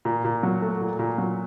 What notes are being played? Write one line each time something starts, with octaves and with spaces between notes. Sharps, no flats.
A#2
A#2
F#3
A3
A#2
A#2
F#3